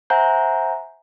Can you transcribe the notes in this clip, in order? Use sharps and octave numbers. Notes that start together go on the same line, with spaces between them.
C5 E5 F#5 G#5 A#5 G6